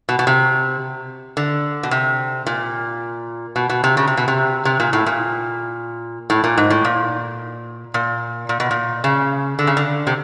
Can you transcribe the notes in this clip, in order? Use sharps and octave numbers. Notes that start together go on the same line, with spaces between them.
B2
B2
C3
D3
B2
C3
A#2
B2
B2
C3
C#3
C3
B2
C3
C3
A#2
A2
A#2
A2
A#2
G#2
A2
A#2
A#2
A#2
B2
A#2
C#3
D3
C#3
D3
C3